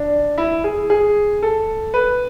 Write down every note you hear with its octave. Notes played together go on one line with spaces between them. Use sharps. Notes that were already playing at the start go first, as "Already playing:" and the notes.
Already playing: D4
E4
G#4
G#4
A4
B4